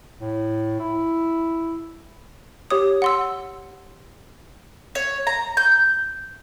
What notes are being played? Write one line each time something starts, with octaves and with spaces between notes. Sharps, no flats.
A2
E4
G4 C#5 D#6
F#5 C6 E6
C#5
A#5
G6